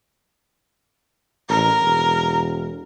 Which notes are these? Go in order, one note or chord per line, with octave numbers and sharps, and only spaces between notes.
A1 A#4
E1